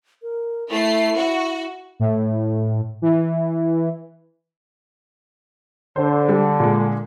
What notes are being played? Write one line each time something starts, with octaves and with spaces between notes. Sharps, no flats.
A#4
A3 E4 C7
F#4
A2
E3
D3 C5
G3
A#2 G#3